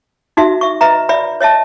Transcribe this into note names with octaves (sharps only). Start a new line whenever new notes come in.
D#4 F#4 E5
E5 C#6
B4 D#5 E5 A#5
D5 E5 B5
C#5 D#5 E5 A5